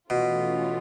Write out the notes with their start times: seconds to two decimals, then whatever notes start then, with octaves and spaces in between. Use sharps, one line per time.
0.10 B2 E3 A3 C#4 F4